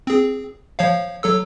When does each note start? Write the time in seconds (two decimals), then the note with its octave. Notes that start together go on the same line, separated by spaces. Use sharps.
0.07 C4 G#4
0.79 F3 C#5 F5
1.23 F#3 A4 E6